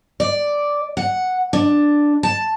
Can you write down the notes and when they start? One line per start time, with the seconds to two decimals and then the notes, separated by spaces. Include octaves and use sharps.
0.20 D5
0.97 F#5
1.53 D4
2.23 A5